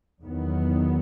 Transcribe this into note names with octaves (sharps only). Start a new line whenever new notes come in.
E2 D#3 F#3 B3